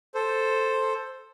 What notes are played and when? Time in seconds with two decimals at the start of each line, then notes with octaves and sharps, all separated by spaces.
0.15 A4 C5